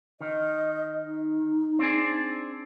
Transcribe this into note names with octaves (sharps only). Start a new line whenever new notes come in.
D#3 D#5
D#4
C4 D4 G#4